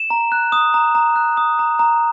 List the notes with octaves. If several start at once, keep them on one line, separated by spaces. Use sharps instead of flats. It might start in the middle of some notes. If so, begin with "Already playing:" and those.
Already playing: E7
A#5
F#6
D#6
A#5
A#5
F#6
D#6
A#5
A#5